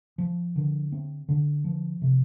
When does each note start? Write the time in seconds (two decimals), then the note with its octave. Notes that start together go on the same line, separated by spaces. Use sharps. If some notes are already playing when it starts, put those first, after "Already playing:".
0.18 F3
0.56 D3
0.92 C4
1.29 D3
1.64 F3
2.02 C3